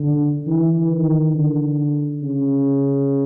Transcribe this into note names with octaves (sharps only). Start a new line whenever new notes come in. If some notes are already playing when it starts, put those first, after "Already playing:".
Already playing: D3
E3
D#3
D3
C#3